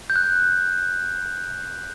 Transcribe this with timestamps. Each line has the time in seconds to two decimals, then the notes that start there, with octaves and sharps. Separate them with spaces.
0.10 G6
0.16 F#6